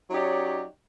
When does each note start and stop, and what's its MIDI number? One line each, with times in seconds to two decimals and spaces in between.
0.11 0.63 54
0.11 0.63 61
0.11 0.63 63
0.11 0.63 67
0.11 0.63 73
0.11 0.63 74